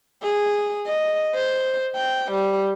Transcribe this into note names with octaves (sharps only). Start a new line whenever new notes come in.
G#4
D#5
C5
G5
G3